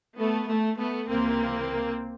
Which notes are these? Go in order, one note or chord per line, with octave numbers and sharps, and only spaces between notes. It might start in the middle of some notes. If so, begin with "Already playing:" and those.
A3 B3
A3
A3 B3
C#2 C3 E3 A#3 C4